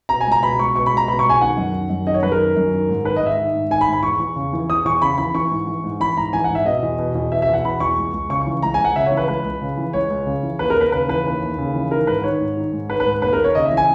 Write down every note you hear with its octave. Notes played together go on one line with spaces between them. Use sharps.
B2 A#5
G#5
C#2
A#5
B2 B5
C#2 C#6
B2 C#6
B5
C#2 A#5
B2 B5
C#6
C#2 G#5
D#3 F#5
F#2
D#3
F#2
D#3 D#5
C#5
F#2 B4
A#4
D#3
F#2
D#3
G#2
D#3 B4
G#2 D#5
E5
D#3
G#2
D#3 G#5
B5
G#2
B5
E2 C#6
E2
C#3
E3
E2 D#6
E2 C#6
C#3 B5
E3 B5
E3 C#6
G#2
E3
G#2
E3 B5
G#2 A#5
E3 G#5
F#5
G#2
E5
B2 D#5
E2
B2
E2
B2 E5
E5
E2 F#5
B2 B5
E2 C#6
C#2
C#2
C#3 C#6
C#6
E3
C#2 A#5
C#2 G#5
F#5
C#3 E5
C#5
E3
B4
C#2 B4
C#2
C#3
E3
C#2 C#5
C#2
C#3
E3
D#2 B4
A#4
D#2
B4
C#3 B4
E3 B4
D#2
D#2
C#3
E3
D#3 A#4
G#2 B4
D#3 C#5
G#2
D#3
G#2
D#3 B4
B4
G#2
D#2 B4
A#4
D#2
C#5
C#3 D#5
E5
E3
G#5